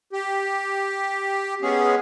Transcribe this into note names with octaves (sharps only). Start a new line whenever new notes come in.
G4
G#3 B3 C#4 G#4